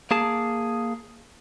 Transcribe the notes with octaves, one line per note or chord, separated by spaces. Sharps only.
A#3 G#4 A5